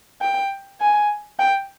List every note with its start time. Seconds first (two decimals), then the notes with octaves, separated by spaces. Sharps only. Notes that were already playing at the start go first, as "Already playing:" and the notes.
0.21 G5
0.81 G#5
1.39 G5